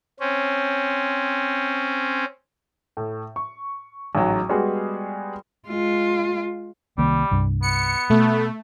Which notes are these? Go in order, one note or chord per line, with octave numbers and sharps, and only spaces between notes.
C4 C#4
A2
C#6
A1 G#2 F#3
G3 G#3 B3 F#4 G#4
G#3 F4
C2 D#3 G3 A#3
C2 G2
B3 C#7
B2 A3